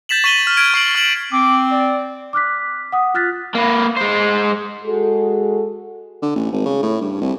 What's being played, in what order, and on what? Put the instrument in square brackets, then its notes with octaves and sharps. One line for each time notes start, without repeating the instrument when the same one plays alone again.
[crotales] G6 A6 B6 E7 F#7
C#6 B6 D#7 F#7 G7
F6 E7
F6 G#6 D7
C#6 C7 D7 F#7
C#6 F6 E7 F#7
[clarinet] C4 [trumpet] D6
[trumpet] D5
[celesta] D6 F6 F#6 B6
F#5 D#6
F4 F6 F#6 A6 B6
[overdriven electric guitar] A#3 B4
G#3 C5
[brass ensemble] G#3 F#4 G#4 A4
[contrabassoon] D3
A1
G#1
C#3
A2
G2
C2